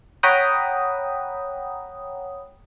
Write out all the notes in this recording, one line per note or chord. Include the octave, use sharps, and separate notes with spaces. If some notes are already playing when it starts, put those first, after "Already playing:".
C#5 F#5 G5 A#5 B5 D#6